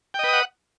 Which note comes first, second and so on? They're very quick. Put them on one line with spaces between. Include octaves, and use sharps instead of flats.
G5 D#5 B4 D#6 F#5